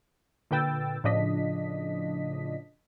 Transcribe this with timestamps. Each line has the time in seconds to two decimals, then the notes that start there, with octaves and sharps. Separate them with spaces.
0.51 A#2 D3 B4 G5 E6 A6
1.04 A2 C#3 F3 D4 D#5 B6